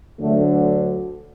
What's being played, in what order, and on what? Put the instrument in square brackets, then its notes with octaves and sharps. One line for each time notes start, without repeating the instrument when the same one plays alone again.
[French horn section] D2 D3 F#3 A3